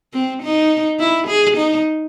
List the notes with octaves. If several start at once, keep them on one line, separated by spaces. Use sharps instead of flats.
C4
D#4
E4
G#4
D#4